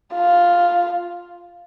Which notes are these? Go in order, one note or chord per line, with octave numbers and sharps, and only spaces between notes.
F4